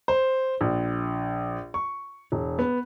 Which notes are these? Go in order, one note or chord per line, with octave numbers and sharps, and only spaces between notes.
C5
A#1
C#6
E1
B3